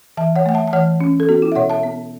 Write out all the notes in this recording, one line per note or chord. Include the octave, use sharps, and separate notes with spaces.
E3 E5 A5
C#5 F#5
A3 F#5
E5 A5
A5
E3 C#5 F#5
C#4
A4
B3 F#4
E4
E5
B2 C#5 F#5
E5 A5
B3